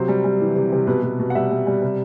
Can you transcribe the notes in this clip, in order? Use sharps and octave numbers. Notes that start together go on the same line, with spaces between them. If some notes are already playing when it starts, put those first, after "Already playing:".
Already playing: C3 F#3 C5
G3
G3
E3
C3
C3
B2 B4
B2
B2
F#5
G3 E5
G3
G3
C3